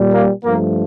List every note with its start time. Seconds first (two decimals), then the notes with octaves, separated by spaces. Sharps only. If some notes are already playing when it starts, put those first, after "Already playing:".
Already playing: A#2 G3
0.12 A#3
0.44 G2 F3 A3 A#3